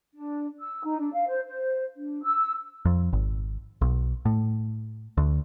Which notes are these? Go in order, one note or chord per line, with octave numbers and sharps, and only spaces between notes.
D4
E6
D#4
D4
F5
C5
C5
D4
E6
F2
G#1
B1
A2
D2